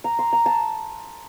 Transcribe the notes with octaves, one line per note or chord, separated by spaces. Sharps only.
A#5
C6
A#5
A5